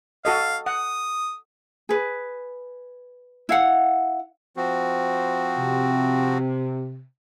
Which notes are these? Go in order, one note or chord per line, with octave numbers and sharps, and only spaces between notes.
F#4 A4 D#5 F5
F#5 D#6
G#4 B4
E4 F5 F#5
F3 C4 F#4
C3